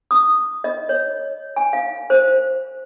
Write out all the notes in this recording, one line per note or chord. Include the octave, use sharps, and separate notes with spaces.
D#6
D#5
C#5
G#5
F5
C5